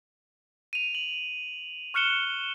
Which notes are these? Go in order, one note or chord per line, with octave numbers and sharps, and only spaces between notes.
D#7 F7
F#7
C#6 F6 F#6 C#7 E7 G7